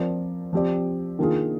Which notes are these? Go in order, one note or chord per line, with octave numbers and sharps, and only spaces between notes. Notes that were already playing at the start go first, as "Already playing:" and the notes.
Already playing: F3 C4 F4 A#4 D5
F3 C4 G4 D5
D#3 A#3 D4 F4 G#4